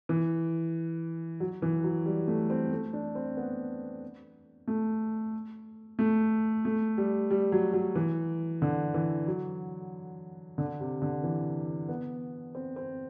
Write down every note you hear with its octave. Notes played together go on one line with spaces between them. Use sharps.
E3
F#3
E3
F#3
G3
A3
C4
A3
D4
C4
B3
A3
A3
A3
G3
G3
F#3
F#3
E3
D3
E3
F#3
D3
C3
D3
E3
B3
C4
C4